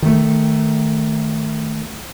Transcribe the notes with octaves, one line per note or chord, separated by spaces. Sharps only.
D#3 A3